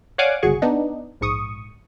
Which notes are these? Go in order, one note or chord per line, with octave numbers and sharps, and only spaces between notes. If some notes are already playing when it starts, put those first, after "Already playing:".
C#5 D5 F5 F#5 G#5 D6
G1 C#2 F#4 G#4 C#6
B3 D4 D#4
A#1 G#2 C#6 D#6